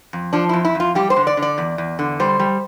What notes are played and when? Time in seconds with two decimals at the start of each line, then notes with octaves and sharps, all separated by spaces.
0.13 F2
0.33 F3 D4
0.49 F2 E4
0.65 E4
0.75 F2 F4
0.95 G3 G4
1.10 C5
1.16 D3
1.27 D5
1.37 D3
1.42 D5
1.58 E2
1.78 E2
1.99 D3
2.20 G3 C5
2.40 G3